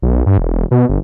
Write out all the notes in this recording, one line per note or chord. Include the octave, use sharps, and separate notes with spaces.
B1
G2
E1
E1
B2
G1